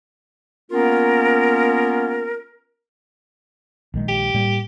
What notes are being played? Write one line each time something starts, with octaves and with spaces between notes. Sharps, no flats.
A#3 B3 C#4 F4 A#4
A#1 D#3 G#3
G4
A2 G3 A#3